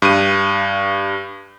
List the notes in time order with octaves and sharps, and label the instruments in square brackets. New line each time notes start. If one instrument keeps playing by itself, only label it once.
[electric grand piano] G2 D#7